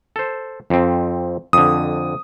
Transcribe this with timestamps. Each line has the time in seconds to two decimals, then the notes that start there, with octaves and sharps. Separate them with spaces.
0.16 A4 C5
0.70 F2 C4
1.53 F2 D3 D#6